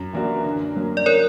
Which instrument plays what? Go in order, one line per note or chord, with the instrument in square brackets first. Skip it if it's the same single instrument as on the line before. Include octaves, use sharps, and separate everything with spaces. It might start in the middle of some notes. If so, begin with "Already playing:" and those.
Already playing: [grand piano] F#2
E3 A#3 D4 F#4
D3
F#3 A#3 C#4
[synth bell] D5
A#4 C#5